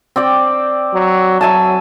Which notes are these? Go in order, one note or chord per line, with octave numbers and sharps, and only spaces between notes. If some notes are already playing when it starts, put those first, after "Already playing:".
C4 D5 G5
F#3
F#3 E5 G#5 A5